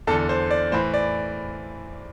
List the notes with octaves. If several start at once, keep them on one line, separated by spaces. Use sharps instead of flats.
E2 D3 A4
C5
D5
A2 E3 C5
D5